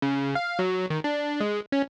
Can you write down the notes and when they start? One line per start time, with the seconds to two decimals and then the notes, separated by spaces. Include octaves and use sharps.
0.02 C#3
0.35 F5
0.59 F#3
0.90 D#3
1.04 D4
1.40 G#3
1.72 C#4